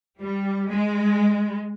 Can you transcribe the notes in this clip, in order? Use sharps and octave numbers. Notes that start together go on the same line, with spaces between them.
G3
G#3